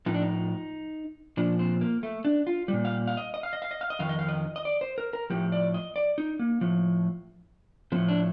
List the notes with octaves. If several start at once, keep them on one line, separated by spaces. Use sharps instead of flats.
A2 F3 D#4
D4
D#4
A#2 F3 D4
C4
A#3
A3
D4
F4
A#2 G3
F5
F5
D#5
D#5
F5
D#5
F5
D#5
F5
D#5
F2 D#3 F5
D#5
F5
D#5
D#5
D5
C5
A#4
A#4
A2 F3 G4
D5
D#5
D5
D#4
A#3
A2 F3
A2 F3 C4
D4